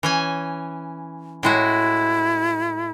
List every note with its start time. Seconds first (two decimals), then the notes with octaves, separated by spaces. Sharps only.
0.03 E3 C#4 G#5
1.43 A2 G#3 E4 F#4